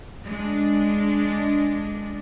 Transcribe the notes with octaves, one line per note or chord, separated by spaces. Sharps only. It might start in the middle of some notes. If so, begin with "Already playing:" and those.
G#3 D4